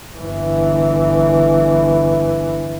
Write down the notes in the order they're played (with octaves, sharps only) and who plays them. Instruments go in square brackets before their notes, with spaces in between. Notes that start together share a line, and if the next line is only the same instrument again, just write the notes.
[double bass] G1 E3